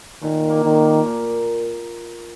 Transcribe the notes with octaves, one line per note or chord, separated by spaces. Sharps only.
A#2 D#3
A#3
D#3
A#3
A#2